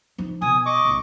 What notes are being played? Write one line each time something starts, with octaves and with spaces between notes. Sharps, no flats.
F3 D#4
B2 G#5 D#6
D#5 C#6 D6
B1 A2